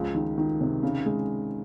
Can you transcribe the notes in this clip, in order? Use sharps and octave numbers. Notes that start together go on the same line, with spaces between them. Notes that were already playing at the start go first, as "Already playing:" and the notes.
Already playing: C#2 F3
D#3
D#3
C3
C#3
G#3